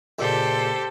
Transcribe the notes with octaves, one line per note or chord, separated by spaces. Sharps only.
C#2 A#2 G4 A4 C5